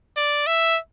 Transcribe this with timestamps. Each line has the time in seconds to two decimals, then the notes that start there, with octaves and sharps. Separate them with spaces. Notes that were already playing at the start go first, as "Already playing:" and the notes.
0.17 D5
0.47 E5